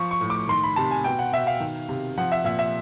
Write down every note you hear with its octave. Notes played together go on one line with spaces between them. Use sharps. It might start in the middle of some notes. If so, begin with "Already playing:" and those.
Already playing: F3 C#6
C#6
A2
D6
D#3 C6
B5
C3 A5
G#5
B2 G5
F#5
B2 E5
F5
D#3
C3
F3 F#5
E5
A#2 E5
E5